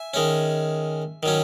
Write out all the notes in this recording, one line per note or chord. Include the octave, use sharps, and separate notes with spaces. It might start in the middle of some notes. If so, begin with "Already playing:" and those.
Already playing: E5 G#5
D#3 G#3 C#4
D#3 F#3 C#4